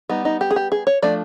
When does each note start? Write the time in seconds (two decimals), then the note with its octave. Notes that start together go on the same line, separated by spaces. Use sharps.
0.09 G3 B3 D#4
0.25 D#4
0.41 G4
0.51 G#4
0.56 G4
0.72 G#4
0.87 C#5
1.02 F3 A3 D4 D5